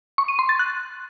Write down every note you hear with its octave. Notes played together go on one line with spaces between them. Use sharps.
C#6
D#7
C6
A6
F#6